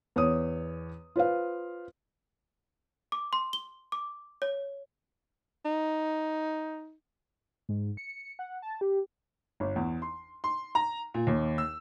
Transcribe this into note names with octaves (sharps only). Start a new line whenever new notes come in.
E2 C#5 D#6
F4 B4 C5 F5
D6
C6
G7
D6
C#5
D#4
G#2
C#7
F#5
A5
G4
G1
E2
C6
C6
A#5
A#2
D#2
E6